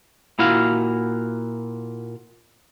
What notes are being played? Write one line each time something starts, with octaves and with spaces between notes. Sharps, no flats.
A#2 E4 F#4 F5